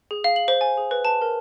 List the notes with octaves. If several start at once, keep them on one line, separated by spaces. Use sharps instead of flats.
G#4
F5
F#7
C5
G#5
G#4
B4
A5
A#4